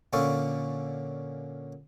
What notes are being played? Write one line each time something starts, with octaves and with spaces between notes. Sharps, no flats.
A#2 D3 C#4 A4 F5 C#6